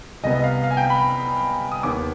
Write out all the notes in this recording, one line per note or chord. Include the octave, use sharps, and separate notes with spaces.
C2 C3 G3 B3 D#5
D#5
F5
F5
G#5
G5
B5
D#6
D#2 D#3 B3 D6